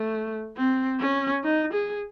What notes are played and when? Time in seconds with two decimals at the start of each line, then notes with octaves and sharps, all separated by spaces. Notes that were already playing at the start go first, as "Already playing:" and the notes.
Already playing: A3
0.57 C4
1.00 C#4
1.44 D#4
1.73 G#4